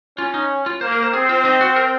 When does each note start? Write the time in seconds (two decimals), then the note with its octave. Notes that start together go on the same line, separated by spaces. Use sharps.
0.18 C#4 F4
0.34 D#4
0.66 F4
0.81 A#3 C5
0.92 A#4
1.02 C5
1.13 C4 G#4
1.29 F4
1.45 D#4
1.61 F#4
1.76 A#4